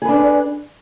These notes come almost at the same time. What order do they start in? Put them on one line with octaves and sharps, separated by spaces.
G#4 B4 D4